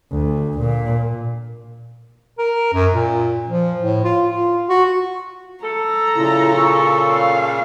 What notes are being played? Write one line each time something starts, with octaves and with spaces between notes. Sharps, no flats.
D2
A#2
A#4
F#2
A#2
F3
A2
F4
F4
F#4
A4 A#5
A#2 C#3 E4
C#6
F5